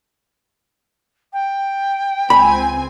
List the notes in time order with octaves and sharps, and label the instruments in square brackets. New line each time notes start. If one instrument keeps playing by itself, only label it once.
[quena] G5
[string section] C#2 C4 G#5 [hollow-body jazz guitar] B5